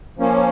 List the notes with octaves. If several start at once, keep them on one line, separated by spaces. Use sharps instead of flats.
F3 A#3 C#4